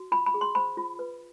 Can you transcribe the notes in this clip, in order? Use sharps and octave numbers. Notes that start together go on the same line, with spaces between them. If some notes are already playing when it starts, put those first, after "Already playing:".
Already playing: F#4
F4 B5
B5
G#4
C6
C5 B5
F4
B4